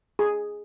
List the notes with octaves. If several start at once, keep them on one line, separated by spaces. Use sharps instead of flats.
G#4